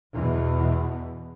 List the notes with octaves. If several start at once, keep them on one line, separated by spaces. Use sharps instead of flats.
E2 B2